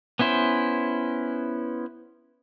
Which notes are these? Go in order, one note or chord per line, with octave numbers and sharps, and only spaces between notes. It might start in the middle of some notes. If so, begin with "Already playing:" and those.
B3 C#4 E4 C5